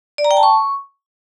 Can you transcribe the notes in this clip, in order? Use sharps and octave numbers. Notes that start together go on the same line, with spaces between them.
D5
A#5
G5
A5
C#6